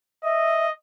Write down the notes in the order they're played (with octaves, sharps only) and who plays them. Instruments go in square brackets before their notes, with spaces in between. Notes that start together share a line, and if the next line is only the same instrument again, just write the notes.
[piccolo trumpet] D#5 [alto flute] E5